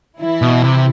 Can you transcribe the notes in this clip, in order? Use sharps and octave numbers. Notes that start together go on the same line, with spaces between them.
E3 E4
B2
C3